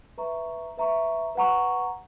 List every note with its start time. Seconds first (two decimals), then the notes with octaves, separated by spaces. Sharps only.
0.18 B4 E5 A#5 C#6
0.78 B4 E5 A#5 C#6
1.35 B4 F#5 A#5 C#6